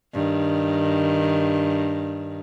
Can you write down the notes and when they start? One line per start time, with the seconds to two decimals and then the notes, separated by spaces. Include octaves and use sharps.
0.13 G2 D#3